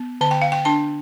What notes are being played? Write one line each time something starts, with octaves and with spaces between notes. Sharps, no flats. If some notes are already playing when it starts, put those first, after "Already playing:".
Already playing: B3
D3 A5
G5
F5
G5
D4 A5